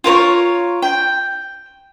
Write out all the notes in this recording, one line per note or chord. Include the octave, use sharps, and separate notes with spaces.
F4 A#4 C5 C#5
G5